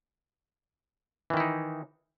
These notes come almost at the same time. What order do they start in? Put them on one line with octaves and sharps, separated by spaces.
E3 D#3 E4 D#4